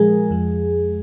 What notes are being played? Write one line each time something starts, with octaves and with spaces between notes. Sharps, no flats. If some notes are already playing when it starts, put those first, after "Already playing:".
Already playing: A#2 F3 G#3 G#4 A#4
F2 F3